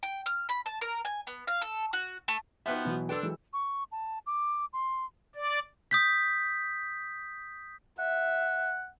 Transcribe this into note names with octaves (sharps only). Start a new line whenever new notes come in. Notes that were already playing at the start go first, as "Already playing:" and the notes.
G5
F6
B5
A5
A#4
G#5
B3
F5
A4
F#4
A3
F3 B3 D#4 F#4 B4 E5 G5
B2 E3 F#3
D4 A4 B4 G5 C6 E6
E3 F#3 G#3
C#6
A5
D6
C6
D5
D#6 G6 B6
E5 F#5